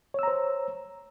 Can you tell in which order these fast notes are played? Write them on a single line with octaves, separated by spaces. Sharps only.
C#5 E6 A#5 C5